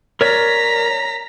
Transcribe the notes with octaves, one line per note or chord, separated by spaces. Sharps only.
A#4 C#5 D5 A#5 B6